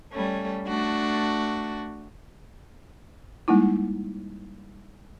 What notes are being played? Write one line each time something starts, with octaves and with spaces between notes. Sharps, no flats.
G3 A3 C#4
A3 D4 F#4
G3 G#3 A#3 D#4 E4